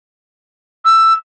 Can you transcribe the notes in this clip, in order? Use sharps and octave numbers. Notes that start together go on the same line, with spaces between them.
E6